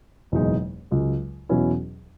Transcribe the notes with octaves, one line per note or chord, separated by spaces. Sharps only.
F#1 E2 B2 G#3 D#4
C#2 C#3 F#3
E2 B2 F#3 C#4 E4